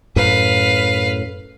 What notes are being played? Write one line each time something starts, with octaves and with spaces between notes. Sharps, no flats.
F#2 A2 B4 F5